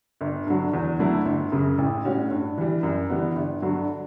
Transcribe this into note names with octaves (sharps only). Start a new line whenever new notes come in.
G1
G2 D3 F#3
E2
D3 F#3 A3 E4
G1
F#2 C#3
A1
A2 G3 C#4 F#4
G2
E3 G3
F#2
E3 G3 B3
G1
G2 D3 F#3